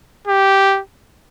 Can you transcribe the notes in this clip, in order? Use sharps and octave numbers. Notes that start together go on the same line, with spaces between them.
G4